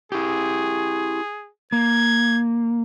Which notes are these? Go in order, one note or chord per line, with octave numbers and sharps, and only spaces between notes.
E4 G4 G#4
A#3 G#6